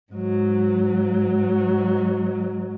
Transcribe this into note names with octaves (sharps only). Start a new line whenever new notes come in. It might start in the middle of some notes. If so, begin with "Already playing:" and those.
G#2 F#3